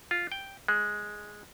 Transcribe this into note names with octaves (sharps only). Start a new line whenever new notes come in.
F4
G5
G#3